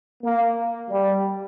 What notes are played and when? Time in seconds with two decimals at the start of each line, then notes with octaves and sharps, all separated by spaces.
0.23 A#3
0.91 G3